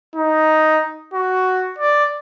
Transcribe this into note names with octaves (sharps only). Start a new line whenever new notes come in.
D#4
F#4
D5